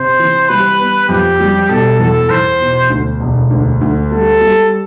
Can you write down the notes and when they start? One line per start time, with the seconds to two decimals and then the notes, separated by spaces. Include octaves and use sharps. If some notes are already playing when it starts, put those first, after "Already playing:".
Already playing: C3 C5
0.19 E3
0.49 G3 B4
0.79 B3
1.09 F2 G4
1.40 G3
1.69 B2 A4
1.99 E2 A4
2.30 E2 C5
2.60 B2
2.90 D2
3.20 E1
3.50 D2
3.81 D2
4.11 G3 A4
4.41 G3